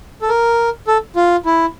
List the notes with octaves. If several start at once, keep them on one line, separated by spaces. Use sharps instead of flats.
A4
A#4
A4
F4
E4